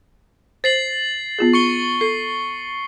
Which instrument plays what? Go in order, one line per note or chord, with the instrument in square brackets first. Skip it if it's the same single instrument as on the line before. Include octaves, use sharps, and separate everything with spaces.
[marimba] C5 [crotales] A6 C7 F#7
[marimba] B3 F4 G#4
[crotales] C#6 C#7 G7
[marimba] A4 [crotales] C7